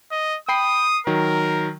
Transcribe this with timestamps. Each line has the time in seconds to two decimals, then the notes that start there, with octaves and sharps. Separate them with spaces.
0.12 D#5
0.49 G5 B5 D#6 C7
1.07 D#3 F#3 A#4